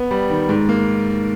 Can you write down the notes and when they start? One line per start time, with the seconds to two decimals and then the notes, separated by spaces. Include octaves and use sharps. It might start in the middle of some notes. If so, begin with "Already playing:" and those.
Already playing: B3
0.11 G3
0.30 D#3
0.49 G#2
0.69 A#3